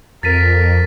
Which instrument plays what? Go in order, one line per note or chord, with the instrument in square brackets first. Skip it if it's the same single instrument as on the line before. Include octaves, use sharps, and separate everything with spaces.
[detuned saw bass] F2 [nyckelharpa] A#4 [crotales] A6 B6 D#7